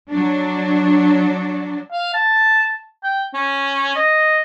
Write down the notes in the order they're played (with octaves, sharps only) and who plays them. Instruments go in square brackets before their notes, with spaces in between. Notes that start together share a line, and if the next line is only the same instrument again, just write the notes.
[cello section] F#3 D4
[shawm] F5
A5
G5
C#4
D#5